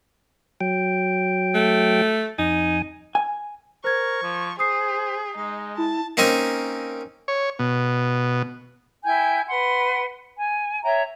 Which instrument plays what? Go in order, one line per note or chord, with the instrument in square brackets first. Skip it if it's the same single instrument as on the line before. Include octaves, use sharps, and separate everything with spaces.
[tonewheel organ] F#3 G5
[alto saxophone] A3
[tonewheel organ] F2 G#5 [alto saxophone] D#4
[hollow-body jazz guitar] G#5
[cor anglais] A#4 [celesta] C5 G#6 [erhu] C#6
[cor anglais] F3
[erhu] G#4 [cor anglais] C5 [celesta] D#6 C7
[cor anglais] G#3 [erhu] D#4
[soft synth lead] E4 [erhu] A5
[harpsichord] A#3 C4 C#4 D#4 G#5
[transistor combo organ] C#5
B2
[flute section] E4 G5 G#5 G6
B4 F#5 C6
G#5
C#5 E5 G5 A#5